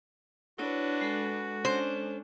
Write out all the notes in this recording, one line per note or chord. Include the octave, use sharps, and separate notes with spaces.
D4 E4 F#4 B4 C#5
G#3 A4
C#4 D4 C5